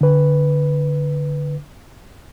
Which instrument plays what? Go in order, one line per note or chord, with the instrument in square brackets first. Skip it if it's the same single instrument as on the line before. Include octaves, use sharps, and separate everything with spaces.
[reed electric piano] D3 B4